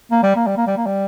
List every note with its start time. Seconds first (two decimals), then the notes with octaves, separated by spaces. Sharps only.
0.11 A#3
0.23 G3
0.36 A#3
0.47 G3
0.57 A#3
0.67 G3
0.77 A#3
0.86 G3